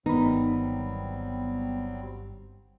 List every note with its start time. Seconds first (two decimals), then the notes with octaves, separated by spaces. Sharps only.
0.06 G1 D#3 F#3 G3 B3 C4 D#4 B5